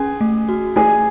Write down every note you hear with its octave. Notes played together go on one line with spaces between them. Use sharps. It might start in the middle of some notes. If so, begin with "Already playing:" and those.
Already playing: C#4 G#4 G#5
A3
F#4
A3 G#4 G#5